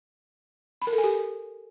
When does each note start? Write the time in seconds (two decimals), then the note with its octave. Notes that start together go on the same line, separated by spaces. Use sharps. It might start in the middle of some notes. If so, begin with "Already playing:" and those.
0.82 B5
0.87 A#4
0.93 A4
0.98 G#5
1.04 G4